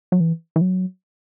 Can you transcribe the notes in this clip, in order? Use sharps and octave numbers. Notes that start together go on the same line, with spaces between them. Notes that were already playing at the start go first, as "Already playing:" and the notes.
F#3
E3
E3
F#3